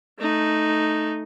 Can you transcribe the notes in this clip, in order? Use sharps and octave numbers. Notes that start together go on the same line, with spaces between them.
A3 D#4